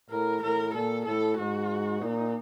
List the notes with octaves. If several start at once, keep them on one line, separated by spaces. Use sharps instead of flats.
A2 A#4
A2 A#4
A#2 A4
A2 A4
G#2 F#4
A#2 D#4